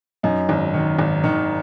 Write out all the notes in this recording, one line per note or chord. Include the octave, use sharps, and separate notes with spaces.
F#2 D#4
G#1
D#3
G#1
D#3